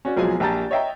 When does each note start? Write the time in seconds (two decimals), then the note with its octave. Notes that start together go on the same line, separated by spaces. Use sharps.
0.05 C#4 F#4 D5
0.17 B1 F3 F#3 G#3 G#4 G#5
0.40 A#1 G4 A5 A#5 G6 A6
0.71 C#5 D#5 E5 G5 A#5